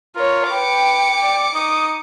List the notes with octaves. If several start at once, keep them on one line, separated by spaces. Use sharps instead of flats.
F4 A#4 C#5
B4 G5 D6 C#7
D5
D#4 D#6